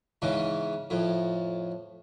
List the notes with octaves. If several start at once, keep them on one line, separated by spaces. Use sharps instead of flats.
E2 G#2 C#3 E3
F2 A2